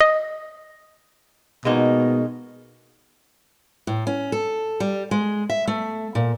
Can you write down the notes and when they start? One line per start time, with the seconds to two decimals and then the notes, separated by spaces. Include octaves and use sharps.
0.01 D#5
1.65 B2 G#3 A#3 D#4
3.87 A2
4.07 C#4
4.32 A4
4.80 G3
5.11 G#3
5.50 E5
5.67 A3
6.15 A#2